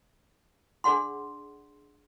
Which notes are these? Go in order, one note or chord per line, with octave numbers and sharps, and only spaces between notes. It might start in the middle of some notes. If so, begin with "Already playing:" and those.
D4 G#4 D5 F#5 C6